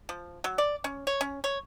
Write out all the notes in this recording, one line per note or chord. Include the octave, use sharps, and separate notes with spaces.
F3
F#3
D5
C#4
C#5
C#4
C#5